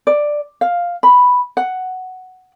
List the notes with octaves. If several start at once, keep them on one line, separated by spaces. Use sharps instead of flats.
D5
F5
B5
F#5